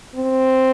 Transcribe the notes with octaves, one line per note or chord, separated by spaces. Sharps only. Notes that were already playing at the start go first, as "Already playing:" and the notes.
C4